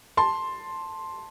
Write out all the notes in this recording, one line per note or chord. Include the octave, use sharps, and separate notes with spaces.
A5 C6